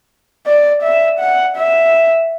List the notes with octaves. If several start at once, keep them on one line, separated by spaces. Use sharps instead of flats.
D5
E5
F#5
E5